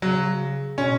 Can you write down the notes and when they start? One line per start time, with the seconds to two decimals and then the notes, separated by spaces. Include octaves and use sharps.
0.02 C#3 F#3
0.78 B2 C#4